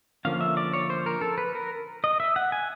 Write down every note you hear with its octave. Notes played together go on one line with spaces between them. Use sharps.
D3 F3 A#3 C#4 F5
E5
D5
C#5
C5
A#4
A4
B4
A#4
D#5
E5
F#5
G#5